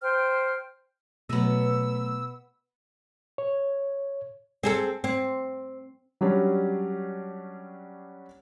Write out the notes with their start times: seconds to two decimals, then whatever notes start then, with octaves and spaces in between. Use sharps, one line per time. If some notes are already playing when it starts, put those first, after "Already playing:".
0.03 C5 G5 F6
1.29 B2 F#3 A3 B3 D#5 E6
3.38 C#5
4.63 C4 G#4 A4
5.04 C4
6.21 F#3 G3 C#4 D4 G4